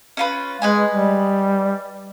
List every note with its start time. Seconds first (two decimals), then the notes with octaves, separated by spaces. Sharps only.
0.17 C#4 F4 B4
0.62 G#3 B4 D#5 G#5
0.91 G3